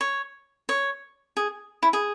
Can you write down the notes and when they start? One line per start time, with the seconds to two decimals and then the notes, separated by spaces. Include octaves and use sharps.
0.01 C#5
0.69 C#5
1.37 G#4
1.83 E4
1.93 G#4